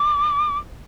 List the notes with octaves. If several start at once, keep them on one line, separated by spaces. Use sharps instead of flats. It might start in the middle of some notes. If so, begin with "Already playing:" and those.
Already playing: D6